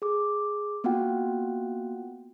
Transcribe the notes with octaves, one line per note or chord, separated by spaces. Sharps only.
G#4 D6
A#3 B3 F4 F#4 F#5 G5